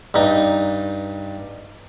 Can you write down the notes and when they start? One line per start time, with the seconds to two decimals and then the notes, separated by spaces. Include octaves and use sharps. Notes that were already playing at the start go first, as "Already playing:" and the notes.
0.14 G2 D#4